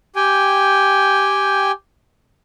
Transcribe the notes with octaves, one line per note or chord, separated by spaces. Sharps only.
G4 G5 G#5